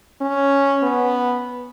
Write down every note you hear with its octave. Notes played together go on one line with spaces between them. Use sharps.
C#4
B3